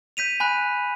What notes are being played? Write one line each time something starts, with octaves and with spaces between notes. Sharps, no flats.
G6 B6 D#7 F7
G#5 B5 F#6